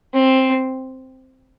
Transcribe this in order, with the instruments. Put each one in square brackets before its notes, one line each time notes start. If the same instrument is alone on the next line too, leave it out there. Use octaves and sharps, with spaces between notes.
[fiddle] C4